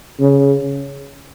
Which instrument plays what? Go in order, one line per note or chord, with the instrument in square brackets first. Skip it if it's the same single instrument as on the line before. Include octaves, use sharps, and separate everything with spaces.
[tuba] C#3